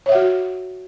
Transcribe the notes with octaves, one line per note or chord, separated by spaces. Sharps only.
F#4 C#5 E5 F#5